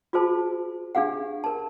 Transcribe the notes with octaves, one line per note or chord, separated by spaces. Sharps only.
F4 F#4 G#4 C5 A5
D4 G4 G#4 F5 F#5
A#4 A5